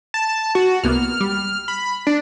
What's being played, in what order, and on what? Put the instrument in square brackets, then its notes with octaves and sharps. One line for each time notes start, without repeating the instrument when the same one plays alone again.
[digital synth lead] A5
F#4
[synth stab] C2 A#3 B3 [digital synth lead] F6
[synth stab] G3
[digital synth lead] B5
D4